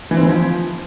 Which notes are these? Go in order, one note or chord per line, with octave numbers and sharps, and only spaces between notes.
E3
C4
E3
F3